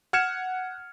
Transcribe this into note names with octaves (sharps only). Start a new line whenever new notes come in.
F#5 F6 G#6 C#7 E7